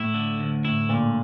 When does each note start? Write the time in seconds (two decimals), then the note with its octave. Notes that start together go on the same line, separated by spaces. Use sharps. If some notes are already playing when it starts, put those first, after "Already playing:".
Already playing: A2 E4
0.14 D3
0.39 D2
0.64 A2 E4
0.89 A#2 D3